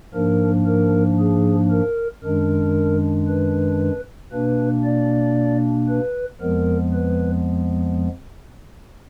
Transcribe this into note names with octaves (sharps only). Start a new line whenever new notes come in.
G#2 F3 A#3 D4 A#4
A#4
G#4
A#4
F#2 D#3 G#3 D4 A#4
B4
B2 A#3 D4 B4
D5
B4
F2 F3 G#3 B3 A#4
B4